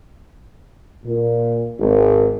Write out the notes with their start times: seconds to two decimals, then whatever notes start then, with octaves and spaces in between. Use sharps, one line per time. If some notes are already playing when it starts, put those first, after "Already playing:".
1.06 A#2
1.79 G#1